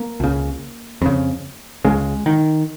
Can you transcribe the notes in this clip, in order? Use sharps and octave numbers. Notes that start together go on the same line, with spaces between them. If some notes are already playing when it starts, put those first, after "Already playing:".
Already playing: A#3
C#2 C#3
F2 C#3
C#2 C#3 G#3
D#3